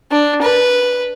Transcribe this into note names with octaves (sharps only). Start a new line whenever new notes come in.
D4
B4